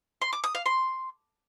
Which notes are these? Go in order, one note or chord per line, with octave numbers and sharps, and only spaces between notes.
C6
D6
D#6
F5
C6